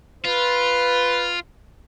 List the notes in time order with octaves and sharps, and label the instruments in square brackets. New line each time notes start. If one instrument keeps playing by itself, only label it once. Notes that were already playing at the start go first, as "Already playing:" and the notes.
[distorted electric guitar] F4 [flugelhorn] B4